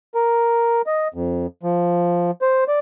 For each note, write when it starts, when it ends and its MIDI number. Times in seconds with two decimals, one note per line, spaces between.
0.15 0.82 70
0.87 1.08 75
1.14 1.47 41
1.63 2.31 53
2.42 2.64 72
2.68 2.79 74